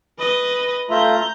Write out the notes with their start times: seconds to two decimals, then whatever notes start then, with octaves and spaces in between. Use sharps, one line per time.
0.19 B4 D#5
0.90 A3 F4 E5 A#5 G6